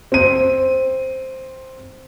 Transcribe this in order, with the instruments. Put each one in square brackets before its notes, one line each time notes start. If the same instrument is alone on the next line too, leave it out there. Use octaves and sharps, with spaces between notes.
[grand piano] C4 D#7